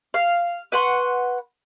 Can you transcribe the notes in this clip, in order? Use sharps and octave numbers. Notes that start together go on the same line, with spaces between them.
F5
B4 F#5 C6 C#6